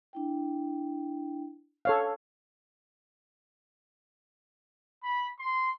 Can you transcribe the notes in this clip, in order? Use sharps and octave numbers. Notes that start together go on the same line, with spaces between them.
D4 E4 G5
A4 C#5 F5
B5
C6